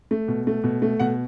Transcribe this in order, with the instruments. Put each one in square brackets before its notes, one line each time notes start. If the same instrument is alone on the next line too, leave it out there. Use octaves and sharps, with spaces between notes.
[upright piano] A3
B2
A3
B2
A3
B2 F#5